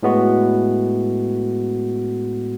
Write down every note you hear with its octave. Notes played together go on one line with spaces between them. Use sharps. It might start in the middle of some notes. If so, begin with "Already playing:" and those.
A2 G#3 B3 F#4